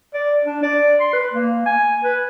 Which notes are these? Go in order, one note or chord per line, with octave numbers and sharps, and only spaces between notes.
D5
D4
D5
C6
B4
A#3
G#5
B4